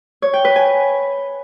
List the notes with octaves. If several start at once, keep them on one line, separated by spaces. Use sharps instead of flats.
C#5
G5
B4
G#5